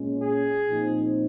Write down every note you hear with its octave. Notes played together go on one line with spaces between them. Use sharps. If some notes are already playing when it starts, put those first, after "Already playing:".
Already playing: A#2 G#3 C#4
G#4
A#2 F3 C4 D#4